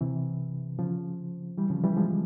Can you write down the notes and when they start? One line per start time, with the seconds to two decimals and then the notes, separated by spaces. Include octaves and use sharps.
0.01 C3 E3
0.79 C#3 F3
1.58 E3 G3
1.70 C#3 F3
1.84 E3 G3
1.97 F3 G#3